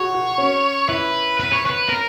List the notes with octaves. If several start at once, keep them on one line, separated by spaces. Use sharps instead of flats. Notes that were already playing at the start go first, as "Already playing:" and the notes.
Already playing: F#4 G#4 C#5
F#4
C#4
E4 B4
B4
C#5
B4
A#4